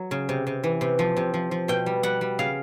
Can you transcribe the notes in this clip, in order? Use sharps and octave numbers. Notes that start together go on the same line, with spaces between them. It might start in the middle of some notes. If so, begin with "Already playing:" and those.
Already playing: F#3
C#3
C3
C3
E3
C3
F3
C3
F3
F3
B2 G5
G3
G3 F#5
G3
C#3 F5